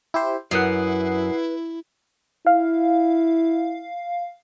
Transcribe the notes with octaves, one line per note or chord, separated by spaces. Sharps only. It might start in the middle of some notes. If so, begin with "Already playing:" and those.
E4 G4 C5
F#2 E4 B4 F#5 D#6 C7
E4 F5